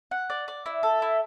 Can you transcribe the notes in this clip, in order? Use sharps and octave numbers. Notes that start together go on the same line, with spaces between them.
F#5
D5
D5
E4
A4
E4